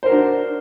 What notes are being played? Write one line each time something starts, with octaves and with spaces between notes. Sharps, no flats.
D4 F#4 A#4 C5